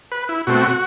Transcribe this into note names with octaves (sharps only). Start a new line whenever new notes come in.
B4
E4
B2 A3 C4 F#4